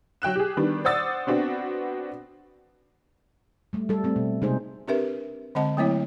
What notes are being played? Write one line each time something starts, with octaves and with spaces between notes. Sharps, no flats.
F#3 G5 F#6 E7
G4 G#4
D#3 G3 B3 D4
C5 D5 F#5 D#6 E6 A6
B3 C4 D4 F#4
G3 A3
G3 A4
A3 C4
B2
C3 G#3 A3 D#4 G#4 C5
C4 D4 G4 A#4 B4 E5
D3 G#3 C4 D#5 F#5 A5
F#3 A3 A#3 C4 E4 C#5